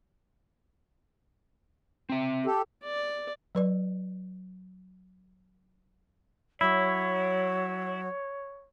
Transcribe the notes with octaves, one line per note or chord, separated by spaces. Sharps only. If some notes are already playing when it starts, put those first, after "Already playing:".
C4 E5
G4 A4
D5
F#3 B4 D5
F#3 E4 C#5